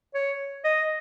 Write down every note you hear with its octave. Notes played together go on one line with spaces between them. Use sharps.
C#5
D#5